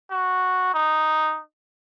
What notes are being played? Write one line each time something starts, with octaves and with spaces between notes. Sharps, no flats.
F#4
D#4